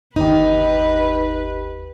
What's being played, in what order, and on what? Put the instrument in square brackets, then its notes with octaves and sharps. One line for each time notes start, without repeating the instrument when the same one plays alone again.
[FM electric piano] G1 D#2 G4 [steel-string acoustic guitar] D#4 [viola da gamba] B4